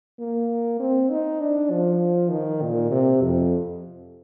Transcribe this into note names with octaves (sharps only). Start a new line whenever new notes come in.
A#3
C4
D#4
D4
F3
D#3
A#2
C3
F2